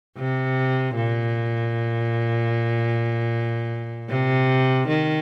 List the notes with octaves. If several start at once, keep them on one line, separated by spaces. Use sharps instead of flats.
C3
A#2
C3
D#3